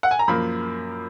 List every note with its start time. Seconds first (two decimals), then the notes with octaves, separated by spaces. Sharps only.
0.03 F#5
0.11 G#5
0.19 A#5
0.28 F#2 F3 A#3 B5